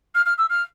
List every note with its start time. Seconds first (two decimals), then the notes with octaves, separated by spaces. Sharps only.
0.15 F6
0.26 F6
0.38 E6
0.50 F6